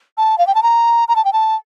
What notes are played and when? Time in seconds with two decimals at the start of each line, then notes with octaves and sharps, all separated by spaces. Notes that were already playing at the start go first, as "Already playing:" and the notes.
0.18 A5
0.38 F5
0.47 G5
0.55 A5
0.63 A#5
1.08 A#5
1.16 A5
1.25 G5
1.33 A5